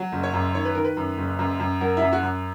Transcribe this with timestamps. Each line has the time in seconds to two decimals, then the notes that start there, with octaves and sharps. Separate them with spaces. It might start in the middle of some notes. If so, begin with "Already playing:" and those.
Already playing: F#3
0.12 F#1
0.23 C#5
0.33 F#2
0.54 D#3 C#5
0.65 B4
0.75 D#3 A#4
0.84 B4
0.97 F#2
1.18 F#1
1.39 F#2
1.60 F#2
1.81 F#3 A#4
1.97 E4
2.02 F#2
2.12 F#4
2.22 F#2